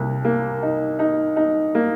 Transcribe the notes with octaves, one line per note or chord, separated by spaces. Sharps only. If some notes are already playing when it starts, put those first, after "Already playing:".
Already playing: C2 A#3
A#3
D#4
D#4
D#4
A#3